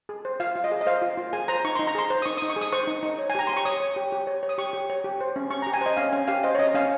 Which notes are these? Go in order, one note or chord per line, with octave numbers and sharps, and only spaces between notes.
G#4
C5
F4 F5
F4
D#5
G#4
D#5
C5 F5
F4
F4
G#4 G#5
C5 A#5
D#4 C#6
D#4 C6
A#5
G#4 C6
C5
D#6
D#4 C#6
D#6
D#4
C#6
G#4
D#6
C5 C#6
D#4
D#4
C#5
G#5
G4 A#5
G4 C6
C#6
C#5 D#6
C#5
G4
G4
C#5
C#5
D#6
G4 C#6
G4
C#5
G4
C5
C#4
C#4 C#6
A#5
G4
G#5
C5 D#5
C#4 F5
C#4 G#5
G4 F5
C5 D#5
C#5
C#4 D#5
C#4 F5